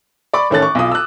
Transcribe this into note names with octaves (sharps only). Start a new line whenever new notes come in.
D5 B5 C#6 D6
A1 D#3 C#4 A4 F#6 A6
C#6
B1 F4 D#6
E6 F#6